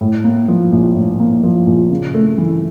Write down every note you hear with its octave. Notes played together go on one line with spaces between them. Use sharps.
A2
A#3
F3
A#1
A2
A#3
F3
A#1
C#3
A3
E3